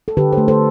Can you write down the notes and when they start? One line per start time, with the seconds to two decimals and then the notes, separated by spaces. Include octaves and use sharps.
0.08 A4
0.17 D3 G4 B4
0.33 A4 C5
0.38 A3
0.48 A4 C5